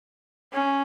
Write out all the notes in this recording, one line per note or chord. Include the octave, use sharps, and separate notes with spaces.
C#4